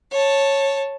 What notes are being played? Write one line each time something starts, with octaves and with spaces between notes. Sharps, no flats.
C#5 A5